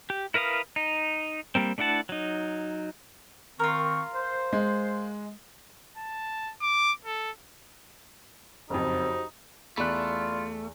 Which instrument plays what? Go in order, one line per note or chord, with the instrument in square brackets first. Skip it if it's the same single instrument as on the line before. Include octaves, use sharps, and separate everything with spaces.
[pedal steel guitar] G4
E4 A#4 B4 F5 D#6
D#4
G3 A#3 C4
A3 D4 E4 F#5 A5
F#3 D#4
[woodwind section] D#3 C4 C#6 [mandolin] F4 A#4
[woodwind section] C5
[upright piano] G#3
[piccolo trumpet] A5
D6
A4
[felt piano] F#1 F2 [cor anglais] D#4 [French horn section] F#4 G4 C5
[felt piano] E2 F#6 [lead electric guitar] A3 [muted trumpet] F4 [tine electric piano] D5 B5